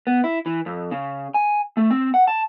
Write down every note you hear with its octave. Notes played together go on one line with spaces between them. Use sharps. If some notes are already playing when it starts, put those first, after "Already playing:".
B3
E4
E3
F2
C#3
G#5
A3
C4
F#5
A5